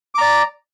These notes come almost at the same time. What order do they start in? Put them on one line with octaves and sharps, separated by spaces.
D6 A#5 D5